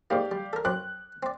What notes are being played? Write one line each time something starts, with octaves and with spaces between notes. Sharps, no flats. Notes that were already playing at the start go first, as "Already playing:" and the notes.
G#2 A#3 G4 D5 F5
G3
A4 A#4
F#2 C4 D6 F#6
C4 D5